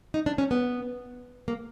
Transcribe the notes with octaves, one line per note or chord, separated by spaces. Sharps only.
D#4
D4
C#4
B3
A#3